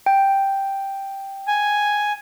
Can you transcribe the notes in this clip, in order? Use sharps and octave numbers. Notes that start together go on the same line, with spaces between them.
G5
G#5